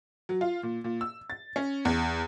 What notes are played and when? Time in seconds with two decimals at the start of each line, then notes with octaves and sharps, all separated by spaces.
0.29 F#3
0.41 F4
0.63 A#2
0.84 A#2
1.01 E6
1.30 A6
1.56 C#4
1.85 E2